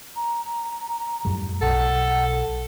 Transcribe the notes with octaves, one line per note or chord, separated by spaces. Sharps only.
A#5
F#2 A2 G3
B1 A4 F#5